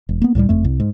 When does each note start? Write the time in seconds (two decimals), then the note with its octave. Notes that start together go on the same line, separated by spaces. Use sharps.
0.09 E1
0.22 A#3 B3
0.35 C#2 A2 F#3 G3
0.49 F#1 F2 A3
0.64 C2
0.80 G#2